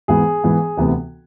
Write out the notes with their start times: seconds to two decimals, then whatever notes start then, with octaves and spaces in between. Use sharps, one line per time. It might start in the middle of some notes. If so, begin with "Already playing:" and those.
0.08 G#2 E3 B3 G#4
0.44 G#2 E3 B3
0.77 D2 C3 E3 B3